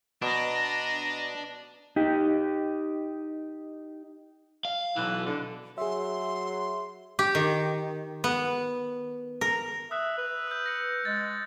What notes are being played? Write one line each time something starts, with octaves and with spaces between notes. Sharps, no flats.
B2 D4 D#5 A#5
D#4 G4
F5
B1 E3
D3
F#3 G#4 E5 C6
G4
D#3
B3
A#4
E5 D#6 E6 F#6
B4
E6 G6
A#6 C#7
G#3 A6